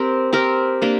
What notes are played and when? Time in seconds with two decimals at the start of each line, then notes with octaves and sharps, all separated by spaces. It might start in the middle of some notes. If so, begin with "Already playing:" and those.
Already playing: C4 G4 A#4
0.33 C4 G4 A#4
0.82 A#3 D4 G4